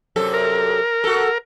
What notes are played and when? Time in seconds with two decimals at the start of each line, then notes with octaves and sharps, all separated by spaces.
0.16 F#2 C3 A4
0.34 A#4
1.04 F#4 A4